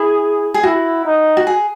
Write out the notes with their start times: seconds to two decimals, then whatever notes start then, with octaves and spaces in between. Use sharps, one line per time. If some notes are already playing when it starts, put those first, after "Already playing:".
Already playing: E4 G#4
0.54 G#4
0.63 E4 F#4
1.05 D#4
1.37 F#4
1.47 G#4